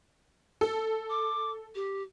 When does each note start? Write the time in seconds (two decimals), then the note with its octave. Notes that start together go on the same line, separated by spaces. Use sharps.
0.61 A4
1.10 D6
1.75 G4